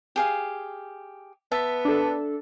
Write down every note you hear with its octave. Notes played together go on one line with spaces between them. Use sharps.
G4 G#4 F5
B3 E5 A5
D4 A4